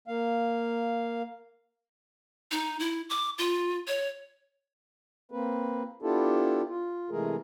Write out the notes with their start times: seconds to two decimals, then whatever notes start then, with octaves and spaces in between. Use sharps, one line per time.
0.08 A#3 F5
2.51 D#4
2.80 E4
3.10 D6
3.38 F4
3.87 C#5
5.32 A#3 C4 B4
6.02 B3 D4 E4 F4 G4 A4
6.68 F4
7.11 C3 E3 G#3 A3 G#4 A#4